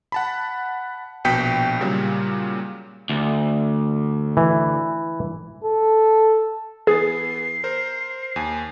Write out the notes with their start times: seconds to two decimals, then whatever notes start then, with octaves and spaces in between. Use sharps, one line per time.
0.12 F#5 A5 B5
1.25 A#1 B2 G5 G6 B6 C#7
1.81 A#2 C#3 F#3 G3
3.09 D2
4.37 E3
5.64 A4
6.87 E3 B3 G#4 A6 C7
7.64 A#4 C5
8.36 D#2 G#5